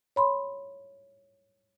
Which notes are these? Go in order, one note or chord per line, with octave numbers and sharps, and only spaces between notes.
C#5 B5 C6